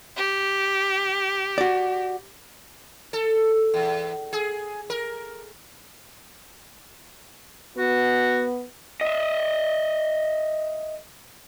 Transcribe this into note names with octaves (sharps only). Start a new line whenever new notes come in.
G4
F#4 D5
A4
E2
G#4
A#4
B3 F#4
D#5 E5